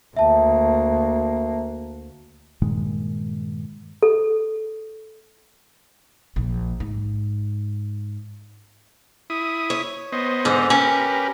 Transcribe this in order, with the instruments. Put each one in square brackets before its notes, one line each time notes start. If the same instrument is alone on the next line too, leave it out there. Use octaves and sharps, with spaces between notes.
[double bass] D2 A#3 [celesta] E5 A5
[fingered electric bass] G2 A#2 D#3 G#3
[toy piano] A4
[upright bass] A#1
G#2
[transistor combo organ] E4 D#6
[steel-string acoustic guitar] C#5
[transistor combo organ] B3 C5 D#5
[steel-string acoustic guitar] G#2 D3
[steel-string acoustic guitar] C#4 [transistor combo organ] G4 A#4 B4